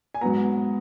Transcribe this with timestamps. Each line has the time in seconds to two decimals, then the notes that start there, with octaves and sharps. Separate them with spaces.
0.14 G#5
0.21 G#2 F#3 B3 A#5